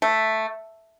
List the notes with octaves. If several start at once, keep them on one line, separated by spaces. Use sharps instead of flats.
A3